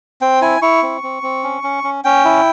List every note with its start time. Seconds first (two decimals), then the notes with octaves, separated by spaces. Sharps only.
0.21 C4 G5
0.42 E4 G#5
0.62 E4 C#6
0.83 C4
1.03 C4
1.23 C4
1.44 C#4
1.64 C#4
1.84 C#4
2.04 C#4 G5
2.25 E4